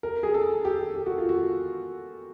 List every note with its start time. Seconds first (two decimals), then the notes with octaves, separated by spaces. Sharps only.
0.03 A#4
0.23 G#4
0.34 A4
0.65 G4
0.95 G4
1.06 F#4
1.18 F4
1.29 F#4